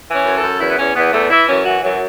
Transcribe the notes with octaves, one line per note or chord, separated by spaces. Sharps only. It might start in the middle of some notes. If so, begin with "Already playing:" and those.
E3
C#4
F#2
A4
F#2
E2 E4
B3
E2 C#4
E2 B3
E2 A3
E3 E4
F#2 C#4
E3 F#4
F#2 F#3